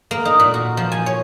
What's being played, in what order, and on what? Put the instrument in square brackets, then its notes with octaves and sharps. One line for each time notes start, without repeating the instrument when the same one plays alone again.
[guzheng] A#3
D#4
A#2
F#4
F3
G#5
C#5